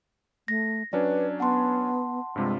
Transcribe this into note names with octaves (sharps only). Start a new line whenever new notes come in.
A3 A#6
F#3 C#4 D4 B4 D5
B3 F#5 A5 C6
G2 C3 G#3 F4